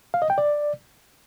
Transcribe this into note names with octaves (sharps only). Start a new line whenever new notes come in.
F5
D#5
G5
D5